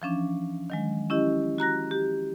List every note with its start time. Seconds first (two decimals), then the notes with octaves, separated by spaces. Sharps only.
0.02 E3 F3 C#4 D4
0.70 D#3 F#3 G#3
1.10 C#4 E4 G4 D#5
1.58 F#4 A#5 F#6 A#6
1.91 G4